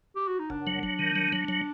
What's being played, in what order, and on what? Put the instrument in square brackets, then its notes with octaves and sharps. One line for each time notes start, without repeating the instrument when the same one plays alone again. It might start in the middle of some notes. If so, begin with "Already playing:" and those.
[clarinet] G4
F#4
D#4
[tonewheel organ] F#1 [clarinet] D4
[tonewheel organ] F#3
F#3
D#3
F#3
F#3
F#3